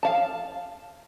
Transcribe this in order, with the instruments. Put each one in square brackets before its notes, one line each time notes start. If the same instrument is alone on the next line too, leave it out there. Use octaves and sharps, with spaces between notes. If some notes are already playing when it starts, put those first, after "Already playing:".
[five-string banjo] F5 A5